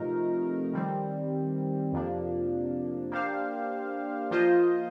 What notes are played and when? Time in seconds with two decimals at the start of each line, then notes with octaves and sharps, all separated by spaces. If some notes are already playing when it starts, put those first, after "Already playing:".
Already playing: C3 F3 A3 D#4 A#4
0.73 D#3 G3 C4
1.92 F2 C3 F3 A#3 D4
3.11 A#3 D4 G4 C5 F5
4.31 F3 A#3 F4 C5 D#5